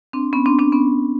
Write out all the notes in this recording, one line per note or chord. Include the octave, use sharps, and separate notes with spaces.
C4 D4
B3 C#4
C4 D4
C4 D4
B3 C#4